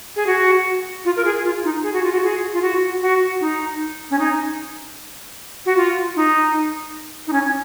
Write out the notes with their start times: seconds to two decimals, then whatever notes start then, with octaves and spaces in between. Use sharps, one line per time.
0.16 G#4
0.26 F#4
1.05 F4
1.16 A#4
1.24 G#4
1.44 F4
1.64 D#4
1.83 G#4
1.93 F#4
2.03 F4
2.12 F#4
2.23 G#4
2.53 F4
2.61 F#4
3.01 F#4
3.40 D#4
4.10 C#4
4.18 D#4
5.65 F#4
5.76 F4
6.16 D#4
7.27 D#4
7.32 C#4